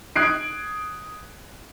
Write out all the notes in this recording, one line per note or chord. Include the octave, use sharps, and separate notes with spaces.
D#6 F#6 G#6 C7 D7